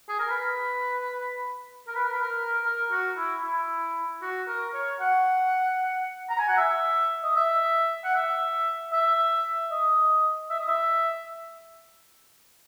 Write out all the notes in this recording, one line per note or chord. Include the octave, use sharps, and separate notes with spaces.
G#4
A#4
B4
A#4
B4
A#4
B4
A#4
A#4
F#4
E4
E4
F#4
A#4
C#5
F#5
A#5
G#5
F#5
E5
D#5
E5
F#5
E5
E5
D#5
E5
D#5
E5